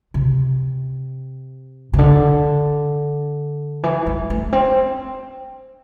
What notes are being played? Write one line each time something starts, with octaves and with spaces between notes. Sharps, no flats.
C3
C3
D3
E3
G3
A3
C4